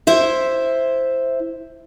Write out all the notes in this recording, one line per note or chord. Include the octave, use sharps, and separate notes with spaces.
E4 C5 E5